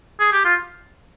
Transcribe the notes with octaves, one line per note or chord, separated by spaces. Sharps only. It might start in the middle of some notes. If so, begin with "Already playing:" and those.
G#4
G4
F4